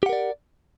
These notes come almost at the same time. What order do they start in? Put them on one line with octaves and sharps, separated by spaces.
G4 F#5 A#4 D5